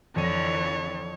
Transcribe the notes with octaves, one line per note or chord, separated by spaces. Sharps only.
F2 D3 E3 C#5 D#7